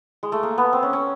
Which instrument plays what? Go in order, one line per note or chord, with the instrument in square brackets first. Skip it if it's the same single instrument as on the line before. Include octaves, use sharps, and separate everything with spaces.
[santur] G#3
A3
A#3
B3
C4
C#4
C#4